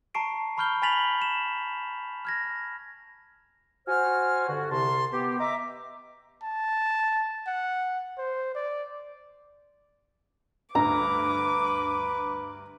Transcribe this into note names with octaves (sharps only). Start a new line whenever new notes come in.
A5 A#5 C#6 C7 D7
A5 B5 C#6 F6 G6 G7
G#5 B5 A6 B6 F7 F#7
E7
F6 G#6 A#6
F#4 C5 G#5 F6
G2 D3 F#4
C2 C3 A5 C6
B3 G4
D#5 E5 A#5 D6
A5
F#5
C5
D5
D2 G2 B4 A#5 D6